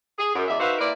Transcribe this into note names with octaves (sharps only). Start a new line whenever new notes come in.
G#4
F#2
E2 G#3 D5 E5
D#4 F#4 B4 C5 E5 F5
A#3 C4 E4 A#4 B4 D5